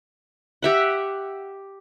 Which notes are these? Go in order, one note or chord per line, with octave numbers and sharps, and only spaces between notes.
G4 E5 F#5